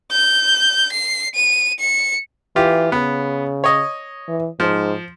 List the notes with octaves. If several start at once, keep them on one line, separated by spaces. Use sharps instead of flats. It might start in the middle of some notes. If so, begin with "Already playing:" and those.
G6
C7
D#7
C#7
E3 F4 G4
C#3 B3
C#5 D#5
E3
G#2 F3